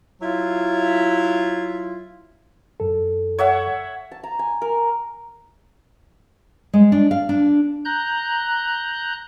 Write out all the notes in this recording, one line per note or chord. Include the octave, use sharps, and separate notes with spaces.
F#3 E4 F4
F#2 A4
C#5 E5 F#5
A5
A#5
G#5
A#4
G#3
D4
F5
D4
A#5 F#6 G6